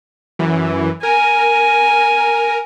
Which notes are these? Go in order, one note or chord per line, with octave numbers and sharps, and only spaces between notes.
F#2 E3
A#4 G#5